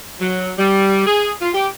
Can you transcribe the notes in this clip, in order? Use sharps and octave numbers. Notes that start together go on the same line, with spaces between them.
F#3
G3
G#4
F4
G4